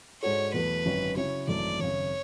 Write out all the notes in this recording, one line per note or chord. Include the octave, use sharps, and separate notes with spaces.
G#2 G#3 D4 F#4 A4 C#5
E2 B2 F#3 A3 B4
G#1 F#2 D3 F#3 C#4
C#3 F#3 C#4 E4 C#5
G#1 F#2 E3 A3 E4 D5
G#1 F#2 C#3 C#5